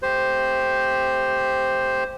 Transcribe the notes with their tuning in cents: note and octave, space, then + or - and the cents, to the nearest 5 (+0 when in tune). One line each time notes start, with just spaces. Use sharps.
A3 +0 G4 +0 C5 +0